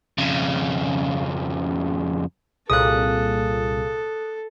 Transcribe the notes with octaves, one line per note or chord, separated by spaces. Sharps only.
F2 C#3
C2 A#2 G#4 A4 F5 D#6 F#6